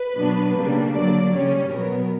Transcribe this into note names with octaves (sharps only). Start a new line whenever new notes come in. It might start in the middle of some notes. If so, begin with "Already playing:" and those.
Already playing: B4
B2 F#3 B3 D4
C#3 G3 A#3 D4
D3 F#3 A#3 D5
C#3 G3 C#4 C#5
B2 F#3 B3 A#4